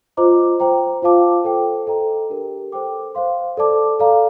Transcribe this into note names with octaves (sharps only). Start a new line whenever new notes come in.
F4 C5 D#5 A#5 D6
C5 G5 A#5
F4 C5 F5 A5 D6
A4 C5 G5
A4 D#5 G5 A#5
D4 G4 A#4
A4 C5 G5 D6
C5 F5 C6
A4 D5 A5 D6
A4 D5 F5 A#5